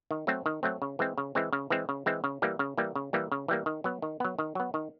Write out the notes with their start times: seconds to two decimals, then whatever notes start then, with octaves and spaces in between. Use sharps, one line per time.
0.11 D#3
0.27 F#3 A3 C4
0.46 D#3
0.63 F#3 A3 C4
0.82 C#3
0.99 E3 G#3 C4
1.18 C#3
1.35 E3 G#3 C4
1.53 C#3
1.70 E3 G#3 C4
1.89 C#3
2.06 E3 G#3 C4
2.24 C#3
2.42 E3 G3 A#3
2.59 C#3
2.77 E3 G3 A#3
2.95 C#3
3.13 E3 G3 A#3
3.32 C#3
3.48 E3 G3 A#3
3.66 D#3
3.84 F#3 B3
4.02 D#3
4.20 F#3 B3
4.39 D#3
4.55 F#3 B3
4.74 D#3